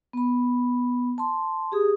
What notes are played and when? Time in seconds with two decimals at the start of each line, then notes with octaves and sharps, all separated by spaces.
0.13 B3 B5
1.18 A5 C6
1.72 G4 G#4 D#6